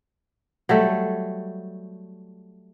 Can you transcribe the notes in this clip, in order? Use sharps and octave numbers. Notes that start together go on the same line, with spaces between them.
F#3 G3 A3